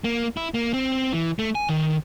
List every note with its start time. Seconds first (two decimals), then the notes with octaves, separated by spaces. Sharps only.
0.04 A#3
0.37 E4
0.54 A#3
0.74 C4
1.13 E3
1.39 A3
1.55 G#5
1.69 D#3